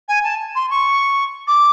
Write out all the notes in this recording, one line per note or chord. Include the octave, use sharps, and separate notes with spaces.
G#5
A5
C6
C#6
D6